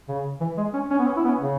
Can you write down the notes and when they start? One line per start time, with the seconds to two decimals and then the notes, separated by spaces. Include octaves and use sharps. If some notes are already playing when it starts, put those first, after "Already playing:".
0.08 C#3
0.41 E3
0.58 G#3
0.74 C#4
0.90 C#4
0.99 B3
1.07 C#4
1.17 E4
1.25 B3
1.28 C#4
1.40 C#3